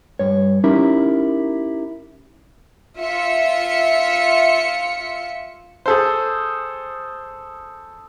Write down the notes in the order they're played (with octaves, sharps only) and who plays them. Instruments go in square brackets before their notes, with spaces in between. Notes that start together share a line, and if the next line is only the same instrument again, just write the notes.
[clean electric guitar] G2 C#5
C#4 D#4 E4 G4 A#4
[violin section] F4 E5 C#7
[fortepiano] G#4 A4 C5